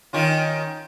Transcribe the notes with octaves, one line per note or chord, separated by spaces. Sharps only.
D#3 C#4 F4